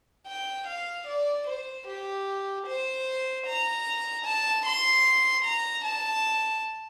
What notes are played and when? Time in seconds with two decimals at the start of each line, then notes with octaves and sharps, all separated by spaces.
0.27 G5
0.67 F5
1.07 D5
1.47 C5
1.87 G4
2.67 C5
3.46 A#5
4.25 A5
4.66 C6
5.44 A#5
5.84 A5